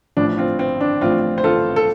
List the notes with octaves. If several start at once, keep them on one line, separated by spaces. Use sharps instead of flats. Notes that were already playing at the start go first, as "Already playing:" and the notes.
A1 A2 F3 D4
C4 F4
C4
D4
A1 A2 F3 C4 F4
C5
F4 A4
A4